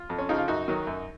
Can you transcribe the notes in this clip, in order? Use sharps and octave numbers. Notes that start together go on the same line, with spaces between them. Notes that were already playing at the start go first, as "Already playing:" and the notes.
Already playing: F4
F2
C#4
C#3 F3 D#4
F4
F#2 D#4 F#4
D#3 F#3
F#2